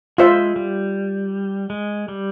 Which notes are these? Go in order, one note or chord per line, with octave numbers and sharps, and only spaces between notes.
G#3 F4 C5 E5
G3
G#3
G3